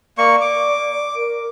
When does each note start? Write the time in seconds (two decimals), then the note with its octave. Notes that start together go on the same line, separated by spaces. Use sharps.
0.18 A#3 D5 C#6
0.41 D6
1.16 A#4